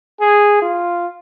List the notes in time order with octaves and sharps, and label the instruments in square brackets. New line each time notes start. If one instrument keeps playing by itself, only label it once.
[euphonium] G#4
F4